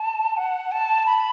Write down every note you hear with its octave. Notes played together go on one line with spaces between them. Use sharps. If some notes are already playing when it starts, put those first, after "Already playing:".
Already playing: A5
F#5
A5
B5